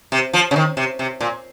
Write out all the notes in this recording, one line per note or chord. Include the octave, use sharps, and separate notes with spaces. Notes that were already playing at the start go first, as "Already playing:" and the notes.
C3
F3
C#3
D#3
C3
C3
A#2